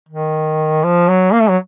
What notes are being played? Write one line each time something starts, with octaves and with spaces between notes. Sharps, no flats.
D#3
F3
F#3
A#3
A3
F#3